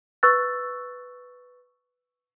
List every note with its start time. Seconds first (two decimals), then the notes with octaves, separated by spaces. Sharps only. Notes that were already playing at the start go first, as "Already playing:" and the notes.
0.23 B4 C#6 E6 F#6 A6